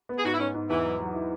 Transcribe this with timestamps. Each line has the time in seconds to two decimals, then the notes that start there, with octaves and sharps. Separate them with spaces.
0.09 B3
0.18 G#4
0.25 G#2 F#4
0.33 E4
0.39 G#2 C#4
0.54 G#2
0.69 E2 E3
0.84 F#3
0.99 F#3
1.14 E4